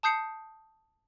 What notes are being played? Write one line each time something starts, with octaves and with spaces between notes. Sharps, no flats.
A5 D#6 G6 C7 C#7